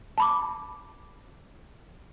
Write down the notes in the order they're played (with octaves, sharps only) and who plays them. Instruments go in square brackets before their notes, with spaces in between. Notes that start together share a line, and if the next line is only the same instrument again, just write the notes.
[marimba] A5 B5 D6